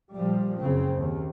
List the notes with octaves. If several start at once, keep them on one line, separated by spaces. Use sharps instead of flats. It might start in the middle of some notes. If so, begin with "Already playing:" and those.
A#2 F3 G3
F#1 C#3 C4
D#2